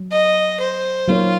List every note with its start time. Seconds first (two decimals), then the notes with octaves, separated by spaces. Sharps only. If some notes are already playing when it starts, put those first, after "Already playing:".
Already playing: F#3
0.12 D#5
0.60 C5
1.08 F#3 A#3 D#4 F4 A#4 C#5